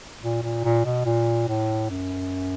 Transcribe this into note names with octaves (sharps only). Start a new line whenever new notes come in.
A#2
A#2
A#2
B2
A#2
A2
F#2